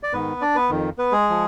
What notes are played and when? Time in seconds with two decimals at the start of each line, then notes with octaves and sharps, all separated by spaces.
0.03 D5
0.13 G#2 D#3 B3 B4
0.42 D4 D5
0.56 B3 B4
0.70 F2 D#3
0.98 B3 B4
1.12 G#3 G#4
1.30 F3